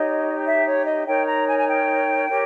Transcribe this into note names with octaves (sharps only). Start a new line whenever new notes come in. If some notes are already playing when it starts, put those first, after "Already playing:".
Already playing: D#4 G4 C#5 D#5
E5
C#5
D#5
D#4 A#4 C#5 G5
A#5
G#5
G#5
G5
G4 A#4 C#5